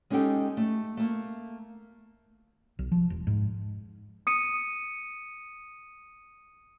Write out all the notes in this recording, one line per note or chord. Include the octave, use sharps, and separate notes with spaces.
G#3 C#4 D#4 G4 A4 G5
A3
A3 A#3
B1
F3
E1
G#2
D#6 C#7 D#7